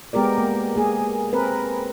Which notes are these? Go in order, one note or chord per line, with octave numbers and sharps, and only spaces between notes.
G#3 B3 G4 A#4 D5
A#3
A#3 G#4
C4 A#4 B4